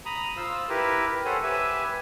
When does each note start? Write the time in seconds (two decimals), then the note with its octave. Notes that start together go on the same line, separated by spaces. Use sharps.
0.05 A#5 B5 D#6
0.37 F4 C5 F5 E6
0.69 E4 G4 A#4 B4
1.25 A4 C5 C#5 F#5 G#5
1.43 G4 B4 E5 G#5